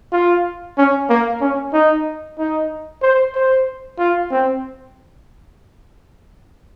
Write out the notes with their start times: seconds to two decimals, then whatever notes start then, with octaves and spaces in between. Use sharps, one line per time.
0.12 F4
0.78 C#4
1.10 A#3
1.41 C#4
1.73 D#4
2.39 D#4
3.02 C5
3.35 C5
3.99 F4
4.31 C4